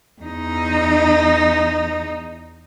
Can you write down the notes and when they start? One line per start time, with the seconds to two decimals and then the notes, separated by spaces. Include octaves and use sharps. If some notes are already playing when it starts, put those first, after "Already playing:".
0.22 E2 D#4